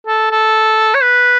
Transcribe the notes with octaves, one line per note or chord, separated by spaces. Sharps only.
A4
A4
C#5
B4